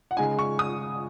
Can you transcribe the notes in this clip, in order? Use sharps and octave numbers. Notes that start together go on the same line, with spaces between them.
F#5
C#3 G#3 D#4 G#5
C#6
D#6